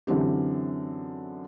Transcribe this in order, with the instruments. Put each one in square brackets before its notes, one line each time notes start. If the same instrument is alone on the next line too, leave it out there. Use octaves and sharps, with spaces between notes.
[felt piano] F#2 D3 E3 C4 G4